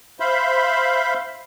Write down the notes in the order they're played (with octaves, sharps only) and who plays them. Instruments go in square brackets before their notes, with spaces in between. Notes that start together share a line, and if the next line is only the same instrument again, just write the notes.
[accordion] C5 E5 F5 B5 C6